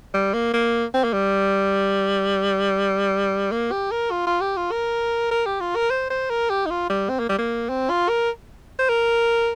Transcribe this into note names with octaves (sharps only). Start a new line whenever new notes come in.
G3
A#3
A#3
C4
A#3
G3
A#3
G4
A#4
F4
F4
G4
F4
A#4
A#4
G4
F4
A#4
C5
C5
A#4
G4
D#4
F4
G3
C4
A#3
G3
A#3
C4
F4
A#4
C5
A#4